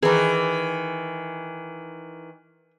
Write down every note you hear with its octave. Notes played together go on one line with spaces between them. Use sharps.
D#3 E3 G#4